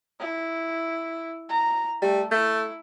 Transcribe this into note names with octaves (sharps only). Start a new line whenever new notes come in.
E4
A#5
G3 A3
A3 E4